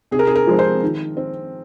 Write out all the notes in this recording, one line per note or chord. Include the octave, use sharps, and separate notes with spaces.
C3 G#4
A#4
G#4
A#4
F3 G#3 C4
C5
D#3
C4